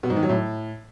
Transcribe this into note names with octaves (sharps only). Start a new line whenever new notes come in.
B2
G#2
D#3
F#3
A2